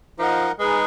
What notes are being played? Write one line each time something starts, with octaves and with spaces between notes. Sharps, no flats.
F3 D#4 A#4 D#5 F#5
G#3 D#4 G#4 B4